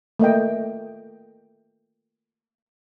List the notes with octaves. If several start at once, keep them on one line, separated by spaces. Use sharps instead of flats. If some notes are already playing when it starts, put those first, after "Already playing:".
A3 A#3 D#5 G5